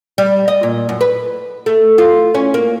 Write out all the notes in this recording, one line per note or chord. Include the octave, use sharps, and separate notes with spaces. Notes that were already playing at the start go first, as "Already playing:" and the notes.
G3
D#5
A#2
F#2
B4
A3
F4
C#4
A#3